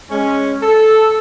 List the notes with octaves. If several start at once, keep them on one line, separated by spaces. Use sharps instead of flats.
G#3 C#4
A4